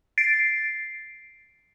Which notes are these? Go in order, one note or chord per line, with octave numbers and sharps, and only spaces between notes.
A6 C7 D7